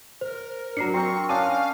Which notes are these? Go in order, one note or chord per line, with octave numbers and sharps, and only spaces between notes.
A#4 C5
F#3 D4 A#5 C7 C#7
C4 A#4 C#6
C#4 D4 F5 G5 D#6 D#7